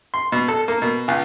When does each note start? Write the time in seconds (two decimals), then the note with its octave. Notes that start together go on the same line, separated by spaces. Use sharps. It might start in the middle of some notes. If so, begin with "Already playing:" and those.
0.14 C6
0.32 B2
0.48 A4
0.68 A#3
0.82 B2
1.08 C#2